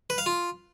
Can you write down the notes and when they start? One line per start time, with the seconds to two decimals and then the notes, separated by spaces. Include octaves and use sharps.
0.10 B4
0.18 F5
0.26 F4